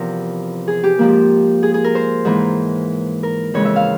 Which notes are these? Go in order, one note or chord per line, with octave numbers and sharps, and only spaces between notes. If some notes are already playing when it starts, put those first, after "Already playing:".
Already playing: E2 C3 F3 A#4
G#4
G4
G#2 F3 A#3
G#4
G#4
A#4
C5
G#2 E3 A#3
A#4
F2 C#3 E3 G#3 C#5
E5
F5